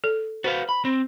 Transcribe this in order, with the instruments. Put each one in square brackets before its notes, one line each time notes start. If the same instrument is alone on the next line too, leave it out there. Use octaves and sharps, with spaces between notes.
[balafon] A4
[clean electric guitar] F#4 B4 F5 [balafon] C5
[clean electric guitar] B5
C4